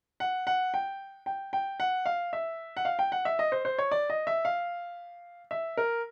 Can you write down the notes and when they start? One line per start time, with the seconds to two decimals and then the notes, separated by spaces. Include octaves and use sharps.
0.20 F#5
0.47 F#5
0.74 G5
1.26 G5
1.53 G5
1.80 F#5
2.06 F5
2.33 E5
2.77 F#5
2.85 F5
2.99 G5
3.12 F#5
3.25 E5
3.39 D#5
3.52 C5
3.65 C5
3.78 C#5
3.91 D5
4.10 D#5
4.27 E5
4.45 F5
5.51 E5
5.77 A#4